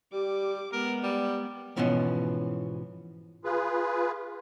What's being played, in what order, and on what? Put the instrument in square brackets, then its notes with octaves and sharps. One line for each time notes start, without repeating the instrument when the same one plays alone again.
[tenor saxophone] G3 [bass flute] G4 [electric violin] D6
[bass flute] G#3 [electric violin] B3 [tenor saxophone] A#4
[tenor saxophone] G3
[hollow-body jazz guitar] G#2 B2 E3 F3 B3 C#4
[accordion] F4 G#4 B4